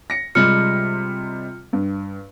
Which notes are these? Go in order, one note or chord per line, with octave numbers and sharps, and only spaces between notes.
A#6 C#7
C3 G3 G#3 F4 F6 C#7
G2